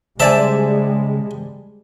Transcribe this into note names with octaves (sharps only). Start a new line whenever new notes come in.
C#3 G3 G#3 C5 D5 E5 G#5 A5